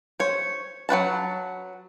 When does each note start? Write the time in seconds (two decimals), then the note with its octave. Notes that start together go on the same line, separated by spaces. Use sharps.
0.20 C5 C#5
0.89 F#3 F#4 B4 A5